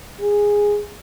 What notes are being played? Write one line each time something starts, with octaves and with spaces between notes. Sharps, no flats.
G#4